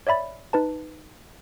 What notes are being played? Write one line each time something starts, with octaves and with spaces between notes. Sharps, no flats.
C#5 D5 E5 B5 A6
D#4 B4 A5